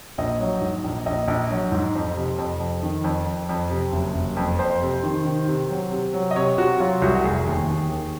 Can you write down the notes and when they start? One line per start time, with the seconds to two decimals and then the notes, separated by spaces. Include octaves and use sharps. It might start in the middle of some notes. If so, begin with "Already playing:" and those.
0.18 A#1 D#5
0.40 F#3
0.61 G#2
0.84 A#1
1.06 A#1 D#5
1.28 A#1
1.51 F#3
1.72 G#2
1.95 F2
2.16 C3
2.38 F2
2.60 F2
2.83 D#3
3.04 F2
3.26 F2
3.49 F2
3.70 C3
3.93 F#1
4.15 F#1
4.37 F2
4.59 F2 C5
4.82 C3
5.04 D#3
5.25 D#3
5.48 C3
5.70 F#3
5.91 C3
6.14 F#3
6.31 D#5
6.36 C3 C#5
6.57 C3 F#4
6.80 F#3 F4
7.02 C2 F#4
7.24 F1 G#4
7.46 D#2
7.67 D#2
7.90 D#2